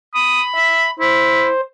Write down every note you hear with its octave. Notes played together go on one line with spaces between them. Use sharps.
B5 D#6
E5
E4 C5